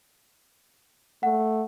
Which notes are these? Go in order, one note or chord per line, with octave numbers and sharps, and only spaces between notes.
A3 F#5